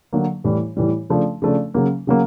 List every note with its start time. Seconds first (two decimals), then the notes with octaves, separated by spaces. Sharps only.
0.13 D3 F#3 A#3
0.44 A2 E3 G3
0.77 A2 E3 G3
1.10 C#3 F3 A3 D4
1.42 C#3 F3 A3 D4
1.74 C#3 F#3 A#3
2.07 C#3 F#3 A#3